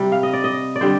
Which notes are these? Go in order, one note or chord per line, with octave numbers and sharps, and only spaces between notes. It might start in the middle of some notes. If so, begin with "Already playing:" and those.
Already playing: C3 G3
F5
D#5
D5
D#5
D5
D3 G3 C5